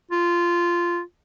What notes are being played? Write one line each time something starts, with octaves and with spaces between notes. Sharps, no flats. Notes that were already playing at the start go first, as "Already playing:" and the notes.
F4